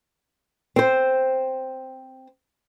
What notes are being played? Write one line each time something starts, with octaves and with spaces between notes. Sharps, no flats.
C4 C5